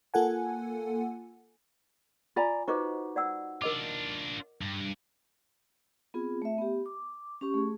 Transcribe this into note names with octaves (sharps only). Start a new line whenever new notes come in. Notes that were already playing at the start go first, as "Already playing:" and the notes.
A#3 F4 A4 F#5 G#5
F4 D5 G#5 A#5
D#4 F#4 B4 C5 D#5 D6
D5 F#5 E6
D4 F4 A#4 D#5 D6
G2
B3 C4 F4 G#4
A3 E5
B3 G4
D6
C#4 G4 C#6
A3 G#4